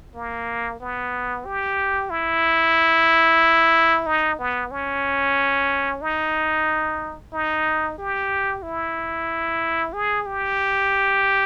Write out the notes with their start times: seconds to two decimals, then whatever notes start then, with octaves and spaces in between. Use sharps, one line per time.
0.14 A#3
0.80 B3
1.45 G4
2.10 E4
4.06 D#4
4.39 B3
4.71 C#4
6.02 D#4
7.33 D#4
7.98 G4
8.63 E4
9.93 G#4
10.26 G4